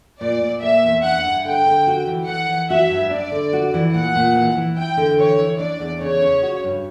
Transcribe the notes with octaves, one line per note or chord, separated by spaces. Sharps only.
A#2 D5
A#2
A#3 E5
E2
D4 F#5
G2
D3 G5
D3
F#4
E3
E3 F#5
E3
F#4 E5
G2
D4 D5
D3
F#4
E3
A#2 F#5
A#2
E3
E3
E4 G5
D3
E3 C#5
E3
D4 D5
E2
C#3 C#5
C#3
F#4
G2